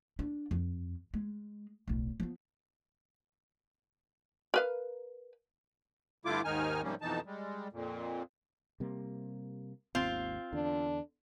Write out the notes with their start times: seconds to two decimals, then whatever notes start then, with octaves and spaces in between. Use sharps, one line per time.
0.19 D4
0.51 F2
1.14 G#3
1.88 D1 B1
2.20 F3 B3
4.54 A#4 B4 F5
6.25 G2 D3 A3 E4 F4 D6
6.45 D#2 G#2 D#3 D#4 G#5 F6
6.82 G#2 C3 F3 G3 A#3 C#4
7.02 F2 B2 E3 D#4 A5
7.26 G3 G#3
7.72 F2 A#2
8.80 C3 G3 A#3
9.95 G#1 D#2 C4 F4
10.53 E2 D3 D4